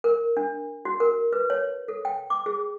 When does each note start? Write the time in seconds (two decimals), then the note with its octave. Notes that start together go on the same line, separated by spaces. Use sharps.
0.04 A#4
0.37 D4
0.85 F#4
1.00 A#4
1.33 B4
1.50 C#5
1.88 A4
2.05 G5
2.30 D6
2.46 G#4